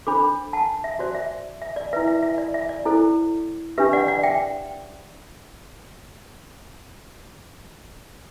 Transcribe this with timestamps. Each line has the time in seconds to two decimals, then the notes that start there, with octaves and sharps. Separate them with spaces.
0.07 D4 A4 C5 B5 D6
0.53 F#5 A5
0.84 E5
0.99 F#4 C5 D5
1.15 E5
1.62 E5
1.76 D5
1.93 E4 B4 E5
2.07 E5
2.23 E5
2.38 D5
2.54 E5
2.69 D5
2.85 E4 A4 C5
3.78 D4 G4 B4 E5
3.93 D5 F#5
4.08 D5 F#5
4.23 E5 G5